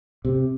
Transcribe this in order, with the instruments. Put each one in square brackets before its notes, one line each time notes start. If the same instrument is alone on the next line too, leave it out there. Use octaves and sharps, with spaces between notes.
[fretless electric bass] C3